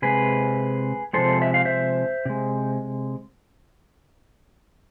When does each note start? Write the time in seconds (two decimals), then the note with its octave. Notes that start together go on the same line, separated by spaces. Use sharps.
0.02 C3 G#3 G#4 B4
1.13 C3 F3 G#3 A4 C5
1.42 E5
1.54 F5
1.65 C5 E5
2.25 C3 G#3